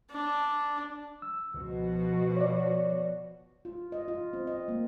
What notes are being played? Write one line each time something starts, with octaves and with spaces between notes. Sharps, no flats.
D4
E6
C#2 B2 F3 F#4
C#5 D5
F4
D#5
F4
C4
D#5
A#3